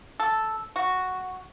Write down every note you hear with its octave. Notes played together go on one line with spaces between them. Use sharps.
A4
F#4